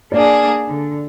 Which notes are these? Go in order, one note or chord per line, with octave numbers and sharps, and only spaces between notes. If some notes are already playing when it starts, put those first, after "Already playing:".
A#3 D4 G#4 D5
D3